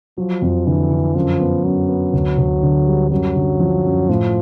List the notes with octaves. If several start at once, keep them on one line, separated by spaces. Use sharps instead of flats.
F3 F#3
F2
D3 E3
D3
F#2 F3
B3
F#2 F#3
B3
D2
D2
D3
G3
F#2 F#3
D3
F3
F#2
A2 F3